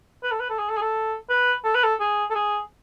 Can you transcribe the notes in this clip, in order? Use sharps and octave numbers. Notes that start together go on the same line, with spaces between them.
B4
A4
B4
A4
G#4
A4
G#4
A4
B4
A4
B4
A4
G#4
A4
G#4